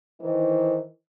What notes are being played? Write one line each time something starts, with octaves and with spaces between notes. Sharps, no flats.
D#3 E3 D#4 C5